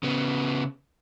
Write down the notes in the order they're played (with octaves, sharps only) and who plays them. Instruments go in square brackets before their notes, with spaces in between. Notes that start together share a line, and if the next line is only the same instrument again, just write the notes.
[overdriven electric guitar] C#3 B3